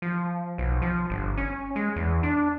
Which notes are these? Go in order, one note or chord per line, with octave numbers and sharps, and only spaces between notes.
F3
B1
F3
G1
C#4
G#3
E2
D4